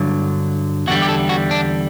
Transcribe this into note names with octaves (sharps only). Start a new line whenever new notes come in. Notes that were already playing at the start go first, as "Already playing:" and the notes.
Already playing: G2 D3 F#3
E2 D3 G3 F#4
G4
A4
F#4
D4